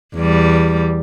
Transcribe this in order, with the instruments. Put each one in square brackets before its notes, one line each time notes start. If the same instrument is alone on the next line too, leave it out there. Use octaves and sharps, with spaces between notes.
[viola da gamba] E2 G3